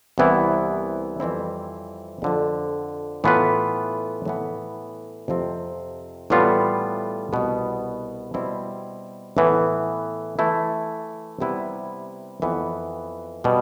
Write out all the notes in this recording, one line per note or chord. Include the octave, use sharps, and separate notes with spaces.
C2 C3 E3 B3 E4
F2 E3 G3 C4 E4
F2 D3 F3
A2 E3 B3 F4 B4
A2 E3 B3
F2 C3 F3 C4
A2 E3 G3 B3 F4
C2 B2 B3
B2 G3 C4 E4
A2 E3 B3
E3 A3 E4 A4
C3 G3 B3 E4 B4
F2 E3 B3
B2 G3